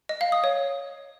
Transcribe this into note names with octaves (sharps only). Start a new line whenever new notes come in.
D#5
F5
D#6
C#5